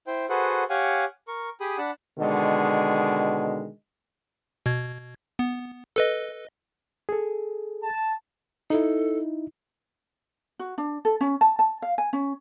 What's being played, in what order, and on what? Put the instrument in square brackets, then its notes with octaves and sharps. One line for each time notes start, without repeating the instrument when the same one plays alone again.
[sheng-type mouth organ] E4 C5 G5
F#4 G#4 A4 B4 C5 F#5
G4 C#5 F5 F#5 G#5
A#4 C#6
G4 G#4 B5 D#6
D4 F#5 A5 B5
[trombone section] B2 D3 D#3 G#3
[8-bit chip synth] B2 G#6
B3
A4 B4 D#5
[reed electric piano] G#4 A4
[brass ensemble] A5
[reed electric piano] D#4 E4 [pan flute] A4
[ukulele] F#4
D4
A4
C#4
A5
A5
F5
G#5
C#4